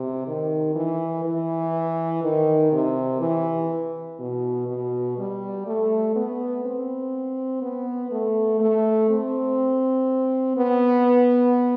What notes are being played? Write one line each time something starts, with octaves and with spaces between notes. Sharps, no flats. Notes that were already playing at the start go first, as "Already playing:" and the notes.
Already playing: C3
D#3
E3
E3
D#3
C3
E3
B2
B2
G3
A3
B3
C4
B3
A3
A3
C4
B3